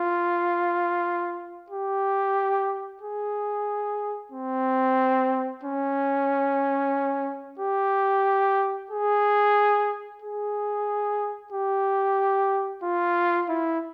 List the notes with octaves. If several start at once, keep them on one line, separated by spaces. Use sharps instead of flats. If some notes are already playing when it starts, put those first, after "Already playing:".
Already playing: F4
G4
G#4
C4
C#4
G4
G#4
G#4
G4
F4
E4